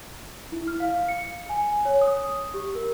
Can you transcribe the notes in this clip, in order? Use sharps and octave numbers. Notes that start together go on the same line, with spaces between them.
E4
F6
F5
C#7
G#5
C#5
D#6
G4
A#4